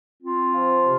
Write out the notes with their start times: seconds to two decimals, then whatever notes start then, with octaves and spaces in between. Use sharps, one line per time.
0.22 C4 F4
0.53 F3
0.84 C3